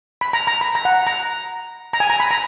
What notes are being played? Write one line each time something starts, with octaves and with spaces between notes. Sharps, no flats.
B5
A#5
A#5
B5
A#5
F#5
A#5
A#5
G#5
A#5
B5
A#5